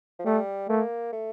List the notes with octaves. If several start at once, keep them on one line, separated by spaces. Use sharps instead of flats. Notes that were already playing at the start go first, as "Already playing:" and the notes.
F3
G3 A3
A3 A#3
A3